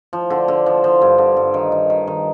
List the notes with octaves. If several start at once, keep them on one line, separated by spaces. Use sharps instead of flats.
F3
D3
D3
F3
F3
G2
D3
G2
D#3
D#3
D#3
D#3